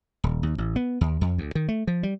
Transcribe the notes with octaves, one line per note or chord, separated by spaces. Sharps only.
D#1
D#2
A1
B3
D#2
F2
D2
D#3
A3
F3
G3